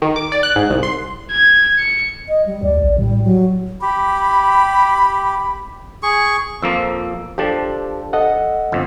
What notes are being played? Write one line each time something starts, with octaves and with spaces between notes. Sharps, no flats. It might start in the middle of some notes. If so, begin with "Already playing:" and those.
D#3
D6
D5
F#6
G#2
C2
C6
G#6
C#7
D#5
G3
D2 D5
A#1
A2 G3
F#3
G4 B5
G#4 C#6
F2 F3 A#3 E6
F3 D4 G4 A4 C5 A5
A4 D#5 F#5
G1 F2